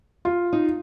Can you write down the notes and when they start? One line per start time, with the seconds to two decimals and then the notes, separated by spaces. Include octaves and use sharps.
0.25 F4
0.53 D#4